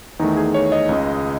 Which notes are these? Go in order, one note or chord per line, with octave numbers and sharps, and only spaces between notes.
E2 D#3 A3 D#4
G#4
C#5
D#5
C#2 C#3 G#3